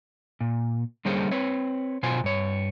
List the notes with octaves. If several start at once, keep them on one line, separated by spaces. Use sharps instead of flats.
A#2
D3 G3 A#3 C#4 G#4 C5
C4 B4 C#5
B2 F4 C5 G#5
G2 C#5